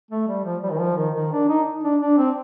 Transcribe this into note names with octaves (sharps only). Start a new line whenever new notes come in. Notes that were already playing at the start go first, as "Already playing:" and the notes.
A3
G3
F3
G3
D#3
F3
D#3
D#3
D4
D#4
D4
D4
C4